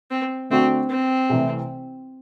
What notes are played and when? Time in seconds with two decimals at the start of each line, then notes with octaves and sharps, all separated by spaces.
0.11 C4
0.50 D3 A3 C4 D4 F#4
0.90 C4
1.29 C2 C3 E3 A3